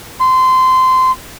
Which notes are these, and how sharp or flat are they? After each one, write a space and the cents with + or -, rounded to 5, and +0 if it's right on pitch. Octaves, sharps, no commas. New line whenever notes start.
C6 -20